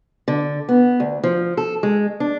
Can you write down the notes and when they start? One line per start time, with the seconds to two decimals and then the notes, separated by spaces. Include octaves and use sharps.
0.28 D3
0.69 B3
1.00 D2
1.24 F3
1.57 A4
1.83 G#3
2.20 D4